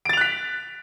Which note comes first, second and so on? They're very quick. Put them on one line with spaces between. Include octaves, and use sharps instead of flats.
D7 A6 F7 F#6 B6